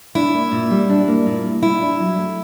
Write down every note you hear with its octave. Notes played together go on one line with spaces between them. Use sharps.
D4 E4
A#3
A#2
G3
D4
A#3
A#2
G3
E4 F4
D4
F#3
A3